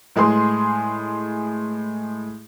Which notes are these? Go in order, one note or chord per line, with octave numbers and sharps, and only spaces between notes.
A2 G#3 G#4 B4 C6